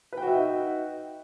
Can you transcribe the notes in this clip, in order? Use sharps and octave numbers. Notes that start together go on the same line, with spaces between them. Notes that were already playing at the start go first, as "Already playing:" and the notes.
D#4 F#4 B4 E5 G5